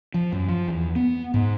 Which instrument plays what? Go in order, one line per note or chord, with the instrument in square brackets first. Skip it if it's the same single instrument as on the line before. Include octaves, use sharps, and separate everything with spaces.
[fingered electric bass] F3
F#2
F3
E2
B3
G#2